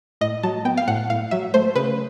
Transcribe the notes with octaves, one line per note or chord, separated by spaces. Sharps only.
A2 D#5
F#3 A5
B3 G5
F5
A2 F#5
A2 F5
F#3 E5
A3 C5
C#3 B4